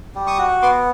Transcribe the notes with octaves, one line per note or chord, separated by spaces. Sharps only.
G3
C#6 D#6
F#4
B3 C6 D6